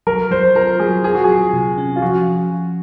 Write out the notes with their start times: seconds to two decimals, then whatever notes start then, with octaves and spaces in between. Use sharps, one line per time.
0.07 F#3 A#4
0.31 F#3 C5
0.55 F4 A#4
0.79 F#3 G#4
1.04 F4 G#4
1.15 F#4
1.24 F#3 G#4
1.53 C3
1.78 C#4
1.96 F4
2.02 F3 F#4